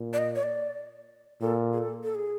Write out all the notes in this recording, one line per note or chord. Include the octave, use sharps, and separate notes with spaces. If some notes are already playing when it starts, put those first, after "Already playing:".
Already playing: A#2
D5
D#5
C#5
D5
A#2 A4
G#4
A4
A4
G#4